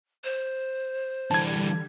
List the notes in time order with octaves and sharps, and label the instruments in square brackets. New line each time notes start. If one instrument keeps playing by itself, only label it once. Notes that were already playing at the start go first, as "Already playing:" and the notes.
[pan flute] C5
[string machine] D3 G3 [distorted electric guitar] E3 D4 [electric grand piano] A5 G#6